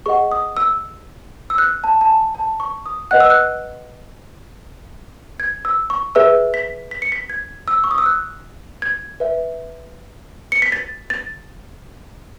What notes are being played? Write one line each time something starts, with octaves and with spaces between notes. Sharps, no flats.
G#4 D#5 F#5 C#6
D#6
E6
E6
F#6
A5
A5
G#5
A5
C#6
D#6
B4 D#5 F#5 F#6
E6
F#6
G#6
E6
C#6
G#4 B4 E5 E6
B6
B6
C#7
B6
G#6
E6
C#6
D#6
E6
F#6
G#6
B4 E5
C#7
B6
A6
A6